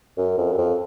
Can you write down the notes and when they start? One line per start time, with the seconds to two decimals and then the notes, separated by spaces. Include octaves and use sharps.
0.18 F#2
0.38 F2
0.52 F#2
0.58 F2